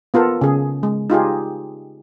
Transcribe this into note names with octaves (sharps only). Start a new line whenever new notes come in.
B3 F4 A4 A#4
C#3 G#4
G#3
D#4 F4 G4 G#4